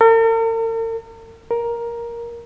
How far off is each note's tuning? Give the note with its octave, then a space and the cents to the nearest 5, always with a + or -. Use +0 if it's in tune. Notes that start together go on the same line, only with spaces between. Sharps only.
A#4 -45
A#4 +10